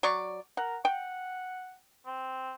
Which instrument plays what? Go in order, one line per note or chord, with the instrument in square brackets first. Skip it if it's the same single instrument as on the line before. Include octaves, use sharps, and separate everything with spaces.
[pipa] F#3 D5 C#6
[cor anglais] A#4 [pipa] F#5
[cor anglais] F#5 [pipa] G5
[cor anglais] C4